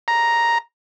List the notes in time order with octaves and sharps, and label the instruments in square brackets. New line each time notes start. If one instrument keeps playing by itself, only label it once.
[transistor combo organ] A#5